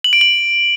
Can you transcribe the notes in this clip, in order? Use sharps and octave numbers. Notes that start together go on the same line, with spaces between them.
F#7
D7
F#7